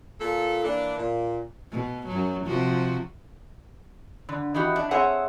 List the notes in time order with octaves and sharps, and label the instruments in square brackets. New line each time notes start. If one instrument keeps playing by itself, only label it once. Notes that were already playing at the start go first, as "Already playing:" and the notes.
[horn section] A#2 F4 A4
E3 A#3 D4
A#2
[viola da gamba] B2
F#2 F#3
C3 F3 F#4
[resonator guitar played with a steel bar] D3
E3 D#4 F#4 G4
D4
C4 G#4 C#5 E5 F#5